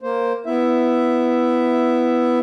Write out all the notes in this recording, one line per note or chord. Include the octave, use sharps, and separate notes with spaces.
A#3 C5
B3 E4 E5